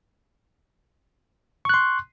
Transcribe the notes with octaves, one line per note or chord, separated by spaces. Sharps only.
C6 C#6 F#6